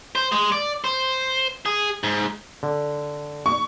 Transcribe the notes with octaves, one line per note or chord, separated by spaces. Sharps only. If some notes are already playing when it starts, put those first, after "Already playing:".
C5
G#3
D5
C5
G#4
G#2
D3
C#6